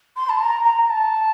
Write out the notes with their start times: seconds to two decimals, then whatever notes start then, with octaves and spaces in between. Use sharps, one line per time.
0.16 C6
0.29 A5
0.40 A#5
0.63 A#5
0.86 A#5
0.90 A5